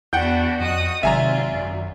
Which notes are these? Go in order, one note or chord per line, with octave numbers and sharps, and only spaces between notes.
E2 B3 D4 F#4 F#5 G5 G6
F2 F#4 D#5 D#6
G#1 C3 F#3 F4 D5 E5 G#5 A#5
F#2